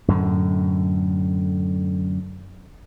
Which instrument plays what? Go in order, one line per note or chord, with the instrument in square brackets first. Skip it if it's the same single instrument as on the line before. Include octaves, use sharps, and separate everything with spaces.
[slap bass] F#2 A2 D3